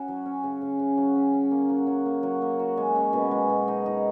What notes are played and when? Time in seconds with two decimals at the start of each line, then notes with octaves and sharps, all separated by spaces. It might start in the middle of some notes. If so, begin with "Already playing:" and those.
Already playing: C#4 F#4
0.08 F#3
0.26 C#4
0.44 C#3
0.62 C#3
0.79 C#3
0.97 F#3
1.15 C#4
1.33 C#4
1.51 A#3
1.69 F#3
1.87 F#3
2.06 A#3
2.23 F#3
2.42 A#3
2.60 F#4
2.77 G#3
2.96 C#4
3.13 B2
3.31 G#3
3.50 B2
3.68 D#4
3.86 D#4